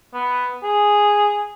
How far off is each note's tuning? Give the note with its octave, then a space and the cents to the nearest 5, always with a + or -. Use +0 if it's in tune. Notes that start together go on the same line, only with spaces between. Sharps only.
B3 +5
G#4 -5